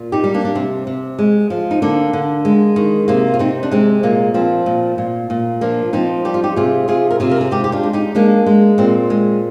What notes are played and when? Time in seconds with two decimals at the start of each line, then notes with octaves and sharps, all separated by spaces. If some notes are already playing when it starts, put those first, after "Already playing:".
Already playing: A#2
0.12 D#4 G4
0.24 G3
0.34 A#3 D4
0.45 D4
0.55 C3 C4
0.87 C3
1.19 G#3
1.50 F3
1.71 D#4
1.82 D3 A#3 D4
2.13 D3
2.45 G#3
2.76 D#3
3.08 C3 A#3
3.34 F4
3.39 C3 C4 D#4
3.63 D4
3.71 G#3 C4
4.03 A#2 A#3
4.34 F3 C4
4.66 A#2
4.98 A#2
5.30 A#2
5.61 F3 A#3 D4
5.93 F3 C4 D#4
6.25 G3 G4
6.34 F4
6.43 D#4 G4
6.56 C3 F4 G#4
6.88 C3 F4 G#4
7.11 A#4
7.20 C3 F4 G#4
7.31 A#4
7.41 G#4
7.51 G#3 D#4 G4
7.64 G4
7.72 D4 F4
7.83 G#3
7.93 D#4 G4
8.15 G#3 A#3 D4
8.46 G#3
8.78 A#2 C4
9.10 G#3